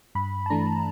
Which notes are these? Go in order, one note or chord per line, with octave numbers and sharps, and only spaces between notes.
G2 B5
A5
E3 A3 D4 A#5